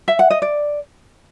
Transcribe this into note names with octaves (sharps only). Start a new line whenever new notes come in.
E5
F#5
D#5
D5